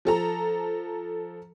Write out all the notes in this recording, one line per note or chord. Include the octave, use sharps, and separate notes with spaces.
F3 A4 A#5